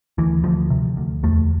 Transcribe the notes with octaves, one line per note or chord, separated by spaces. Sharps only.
D2 E3
D2 F3
C3
D2
E2 A3